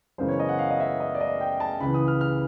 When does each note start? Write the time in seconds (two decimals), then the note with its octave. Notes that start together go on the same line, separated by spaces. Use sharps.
0.18 F#2 C#3 E3 G#3 B3 C5
0.28 C#5
0.39 D#5
0.49 F#5
0.59 F5
0.70 D#5
0.80 E5
1.00 D#5
1.15 D5
1.21 D#5
1.40 G5
1.60 A5
1.81 C#2 C#3 E3 B5
1.94 D#6
2.08 F6
2.21 F6